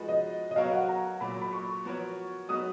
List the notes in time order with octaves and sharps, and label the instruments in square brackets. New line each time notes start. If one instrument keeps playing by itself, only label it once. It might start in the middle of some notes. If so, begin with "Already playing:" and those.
Already playing: [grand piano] F3 G#3 D#4 F#4 B4
[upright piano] D#5
D#5
[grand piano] F#3 B3 F#4 A#4 C#5 [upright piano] F5
[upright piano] F#5
A#5
[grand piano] A#2 F#3 A#3 [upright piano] B5
[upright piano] B5
C#6
[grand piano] F3 B3 F#4 A#4 C#5
[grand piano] F#3 B3 D#4 F#4 B4 [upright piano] D#6